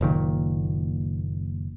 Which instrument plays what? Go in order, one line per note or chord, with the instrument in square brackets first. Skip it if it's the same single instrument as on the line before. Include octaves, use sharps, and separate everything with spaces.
[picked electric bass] F#1 A#2 D#3